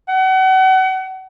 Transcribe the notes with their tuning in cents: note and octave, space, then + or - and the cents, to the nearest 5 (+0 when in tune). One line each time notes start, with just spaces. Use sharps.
F#5 +35